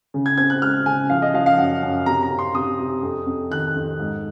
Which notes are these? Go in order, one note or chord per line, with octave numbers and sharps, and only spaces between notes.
C#3
G#6
C4 G#6
F#6
G#3 F6
C#3 G#5
F3 F5
D#5
F3 F5
F5
F#2 F#5
F#2
C3 A#5
A#5
C3
C6
C3 D#6
C3
F2
F2
D#3 F#6
F2
G#2